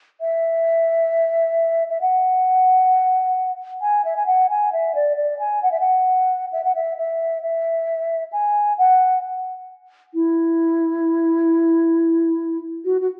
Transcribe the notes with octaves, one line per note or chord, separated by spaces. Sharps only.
E5
E5
F#5
G#5
E5
G#5
F#5
G#5
E5
D5
D5
G#5
F#5
E5
F#5
E5
F#5
E5
E5
E5
G#5
F#5
E4
F#4
F#4